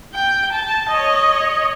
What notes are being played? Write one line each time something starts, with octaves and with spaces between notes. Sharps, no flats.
G5
A5
C#5 D#5